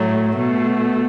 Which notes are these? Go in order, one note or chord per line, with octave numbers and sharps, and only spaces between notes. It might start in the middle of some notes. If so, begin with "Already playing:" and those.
Already playing: A2 F#3 A3
B2 A3